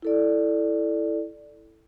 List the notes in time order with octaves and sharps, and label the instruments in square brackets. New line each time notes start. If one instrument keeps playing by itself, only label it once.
[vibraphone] E4 A4 D5